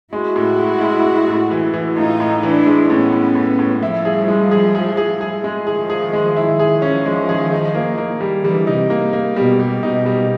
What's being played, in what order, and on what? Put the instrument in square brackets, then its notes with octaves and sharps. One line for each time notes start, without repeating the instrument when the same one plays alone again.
[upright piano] G#3 [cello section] E4 F#4
[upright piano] A2
G#3
G#3
G#3
A2
E3
E3
[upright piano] A2 [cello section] D#4 F4
[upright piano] A2
[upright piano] E3 [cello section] D4 E4
[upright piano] G#3
[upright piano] A2 [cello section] B3 C#4
[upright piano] A2
A2
A2
[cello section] F3 G3 [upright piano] E4
[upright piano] G#4
G#3
G#4
G#4
G#4
G#4
G#3
[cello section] D#3 F3 [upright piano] G#4
[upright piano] G#4
G#3
E4
[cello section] D#3 F3 [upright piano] G#4
[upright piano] C#4
G#3
G#4
D#4
A#3
A#3
G3
[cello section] D3 E3 [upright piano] G3
[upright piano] D#4
[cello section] C3
[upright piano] A#3
A#3
[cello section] B2 [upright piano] G3
[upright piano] G3
[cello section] B2 [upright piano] D#4
[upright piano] G3